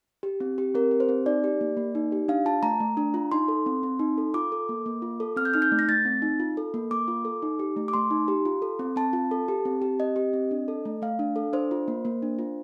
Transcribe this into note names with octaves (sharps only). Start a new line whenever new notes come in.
G4
C4
G4
C4 A#4
G4
C5
C4
D#4 D5
G4
A#3
A#3
D#4
G4
D4 F5
F4 A5
A3 A#5
A3
D4
F4
D#4 C6
A4
C4
C4
D#4
A4
F4 D6
A4
A#3
A#3
F4
A4
C4 F6
G6
D#4 F6
G6
A3
A#6
A3 A6
C4
D#4
F4
A4
A#3
A#3 D6
F4
A4
D#4
G4
A3
D6
A3 C6
D#4
G4
F4
A4
C4
C4 A5
F4
A4
G4
C4
G4
C4 D#5
G4
C4
D4
A4
A3
A3 F5
D4
A4
D4 C5
F4
A#3
A#3
D4
F4